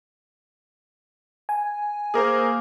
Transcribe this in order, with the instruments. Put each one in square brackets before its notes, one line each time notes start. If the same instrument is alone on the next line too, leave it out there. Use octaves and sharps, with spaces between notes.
[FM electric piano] G#5
[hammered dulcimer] A#3 [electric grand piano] G#4 A#4 C5